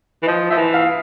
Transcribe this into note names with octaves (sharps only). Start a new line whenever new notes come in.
E3
F3 D#5
F3 E5
E3
F5